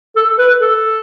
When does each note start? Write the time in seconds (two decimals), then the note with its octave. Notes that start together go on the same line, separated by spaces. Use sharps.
0.16 A4
0.39 B4
0.61 A4